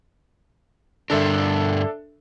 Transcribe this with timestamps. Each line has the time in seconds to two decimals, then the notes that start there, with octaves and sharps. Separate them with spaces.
1.10 G2 D3 D4 A4 A#4 E5